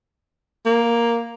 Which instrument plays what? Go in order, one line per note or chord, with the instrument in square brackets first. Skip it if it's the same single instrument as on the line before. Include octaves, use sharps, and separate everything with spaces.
[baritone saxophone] A#3